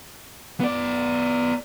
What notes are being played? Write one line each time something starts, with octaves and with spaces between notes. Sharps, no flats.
B3 D5